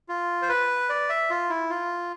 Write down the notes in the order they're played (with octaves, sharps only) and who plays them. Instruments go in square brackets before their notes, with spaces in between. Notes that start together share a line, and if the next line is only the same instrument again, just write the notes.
[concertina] F4
C5
B4
D5
E5
F4
E4
F4